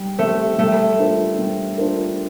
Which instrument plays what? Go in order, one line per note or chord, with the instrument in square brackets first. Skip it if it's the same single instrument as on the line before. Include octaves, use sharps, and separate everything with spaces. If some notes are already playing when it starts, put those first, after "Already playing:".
Already playing: [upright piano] G3
[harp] A3 [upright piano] C4 G4
[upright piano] G3 [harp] A3
[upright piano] A#3 D4 F4 C5
G3
A#3 D4 F4 C5